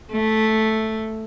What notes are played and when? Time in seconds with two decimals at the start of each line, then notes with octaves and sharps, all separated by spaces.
0.12 A3